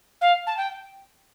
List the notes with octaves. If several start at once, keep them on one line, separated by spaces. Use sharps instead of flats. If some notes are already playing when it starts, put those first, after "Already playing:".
F5
A5
G5